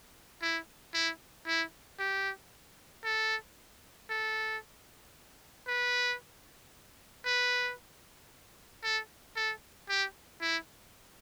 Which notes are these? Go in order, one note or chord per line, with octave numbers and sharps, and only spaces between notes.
E4
E4
E4
G4
A4
A4
B4
B4
A4
A4
G4
E4